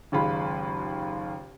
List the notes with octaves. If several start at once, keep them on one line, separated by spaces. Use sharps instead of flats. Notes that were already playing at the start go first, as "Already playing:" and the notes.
F#1 D#2 G#3 F4 B5